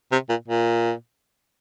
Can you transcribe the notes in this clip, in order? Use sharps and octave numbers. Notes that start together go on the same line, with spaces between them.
C3
A#2
A#2